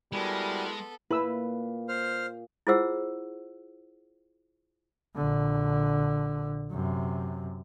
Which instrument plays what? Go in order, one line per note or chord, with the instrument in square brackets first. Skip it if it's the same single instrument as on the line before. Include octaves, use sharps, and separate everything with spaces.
[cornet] G3 [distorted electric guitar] G#3 [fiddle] B3 A4 [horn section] E4 F#4 A#4
[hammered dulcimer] A#2 [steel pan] E4 E6 [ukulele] B4
[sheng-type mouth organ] C5 F6
[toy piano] E4 F4 G#4 C5 F#5 E6
[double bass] A#1 D3
F#2 C3